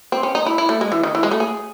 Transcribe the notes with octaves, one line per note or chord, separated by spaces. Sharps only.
C4
C#4
D#4
E4
E4
A3
G#3
E3
D#3
E3
G#3
A3
G#4